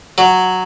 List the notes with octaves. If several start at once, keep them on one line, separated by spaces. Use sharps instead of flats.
F#3